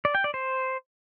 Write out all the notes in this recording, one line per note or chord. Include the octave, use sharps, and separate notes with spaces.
D5
G5
D5
C5